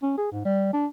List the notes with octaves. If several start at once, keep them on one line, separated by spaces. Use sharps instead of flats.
C#4
G#4
G#2
G3
D4